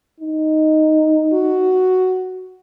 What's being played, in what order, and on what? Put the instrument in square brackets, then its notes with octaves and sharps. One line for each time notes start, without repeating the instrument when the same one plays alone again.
[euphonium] D#4
[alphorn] F#4